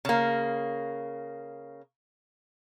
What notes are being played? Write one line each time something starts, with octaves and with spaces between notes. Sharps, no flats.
C#3 A#3